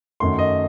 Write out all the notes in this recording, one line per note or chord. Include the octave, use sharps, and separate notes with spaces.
F#2 D#3 A3 C6
D#5